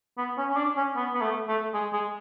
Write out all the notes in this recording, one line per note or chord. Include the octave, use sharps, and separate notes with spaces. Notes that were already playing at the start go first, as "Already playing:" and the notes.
B3
C#4
C#4
D4
C#4
B3
B3
A3
A3
G#3
G#3